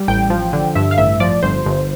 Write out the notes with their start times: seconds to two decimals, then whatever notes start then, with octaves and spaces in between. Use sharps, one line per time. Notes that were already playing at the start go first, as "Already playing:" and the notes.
Already playing: G3
0.08 A1 G5
0.30 F3
0.53 D3
0.75 G2 E5
0.91 F5
0.98 A1 E5
1.20 F3 D5
1.43 G1 C5
1.66 G1